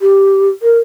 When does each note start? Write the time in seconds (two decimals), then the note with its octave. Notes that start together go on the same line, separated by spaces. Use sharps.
0.01 G4
0.62 A#4